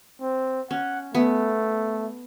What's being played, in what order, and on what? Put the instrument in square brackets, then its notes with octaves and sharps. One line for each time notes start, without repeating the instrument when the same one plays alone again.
[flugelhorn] C4
[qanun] C#4 [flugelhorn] F#5
[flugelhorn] A3 [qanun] B3